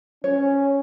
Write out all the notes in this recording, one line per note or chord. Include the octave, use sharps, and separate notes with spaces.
C#4 C#5